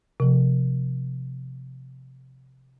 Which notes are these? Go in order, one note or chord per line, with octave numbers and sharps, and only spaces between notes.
C3 F3